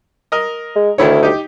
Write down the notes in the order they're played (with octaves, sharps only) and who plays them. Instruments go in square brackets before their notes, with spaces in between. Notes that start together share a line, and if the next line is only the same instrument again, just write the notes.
[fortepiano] A#4 D#5
[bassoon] G#3
[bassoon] D2 [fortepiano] D#3 E4 C#5
[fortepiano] D#4 G4